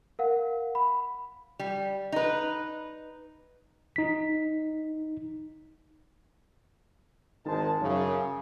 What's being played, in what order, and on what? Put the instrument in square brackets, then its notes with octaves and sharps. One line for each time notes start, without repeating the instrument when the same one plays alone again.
[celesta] A#4 F5 F#5
B5
[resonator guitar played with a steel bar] G3
D#4 B4
[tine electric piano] D#4 B6
[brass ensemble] G#1 D#3 G#3 C5 A5
F#2 C#3